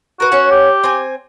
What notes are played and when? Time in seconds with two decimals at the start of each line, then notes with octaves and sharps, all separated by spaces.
0.20 F#4 A#4 B4
0.32 C#4 F#5
0.51 G4
0.84 C4 G#5